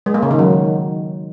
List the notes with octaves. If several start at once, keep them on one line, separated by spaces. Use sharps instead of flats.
G#3
A#3
C#3
D#3
F#3